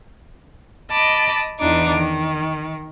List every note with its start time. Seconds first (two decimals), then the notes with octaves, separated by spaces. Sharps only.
0.92 D#5 A5 B5 D6
1.60 E2 E3 D4 D#4 D6
1.95 D#3